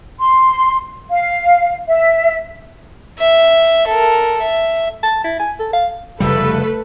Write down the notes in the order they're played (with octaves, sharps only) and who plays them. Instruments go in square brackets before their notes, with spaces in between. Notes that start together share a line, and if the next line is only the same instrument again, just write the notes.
[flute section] C6
F5
E5
[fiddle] E5
A4 A#4
E5
[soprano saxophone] A5
E4
G#5
A4
F5
[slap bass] F1 C#3 G3 [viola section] A3 A4 B4